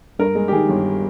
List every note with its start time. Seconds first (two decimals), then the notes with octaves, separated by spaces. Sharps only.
0.19 G2 A#4
0.35 G#3
0.48 G4
0.52 D#3 G#4
0.69 G1